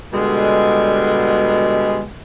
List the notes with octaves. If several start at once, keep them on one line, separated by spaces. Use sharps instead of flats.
B2 D3 G3 G#3